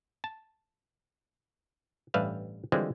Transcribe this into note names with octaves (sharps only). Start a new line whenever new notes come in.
A5
A1 G2 G3 B4 E5 F5
D3 E3 F3 G3 G#3 C4